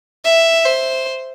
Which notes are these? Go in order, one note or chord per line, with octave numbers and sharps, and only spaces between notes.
E5
C5